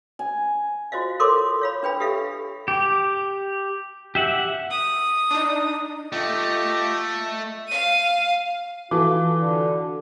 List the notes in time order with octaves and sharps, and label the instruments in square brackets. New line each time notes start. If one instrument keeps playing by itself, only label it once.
[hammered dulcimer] G#5
[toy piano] F4 F#4 C5 D#5 F5
A4 A#4 C#5 C6 D6
C#5 F5 B5
D4 B4 G5 B5
G4 A4 B4 E5 F5
[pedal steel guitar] G4
G4 E5 F#5
[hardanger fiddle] D#6
[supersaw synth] D4 D#4
[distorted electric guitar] A3 [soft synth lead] F4 [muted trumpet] G4 [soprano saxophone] D#5
[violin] F5 D#7
[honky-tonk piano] E3 [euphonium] F4 [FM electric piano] F#4 A4 [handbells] D6
[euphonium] D3